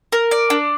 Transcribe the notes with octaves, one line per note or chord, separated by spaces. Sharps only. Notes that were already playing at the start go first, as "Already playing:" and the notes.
A#4
D5
D4